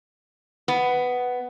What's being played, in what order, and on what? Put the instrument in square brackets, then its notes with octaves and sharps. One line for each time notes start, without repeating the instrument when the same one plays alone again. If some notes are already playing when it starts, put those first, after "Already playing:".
[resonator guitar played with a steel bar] B3